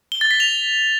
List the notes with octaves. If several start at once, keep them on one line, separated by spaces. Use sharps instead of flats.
G7
A6
B6
F7